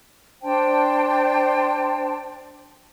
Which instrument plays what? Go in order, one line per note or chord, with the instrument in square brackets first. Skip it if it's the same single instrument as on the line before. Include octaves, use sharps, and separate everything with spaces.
[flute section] D4 C5 G5 A5